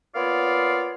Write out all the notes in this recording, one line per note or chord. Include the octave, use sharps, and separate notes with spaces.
A#3 B3 F4 C#5 D5 F5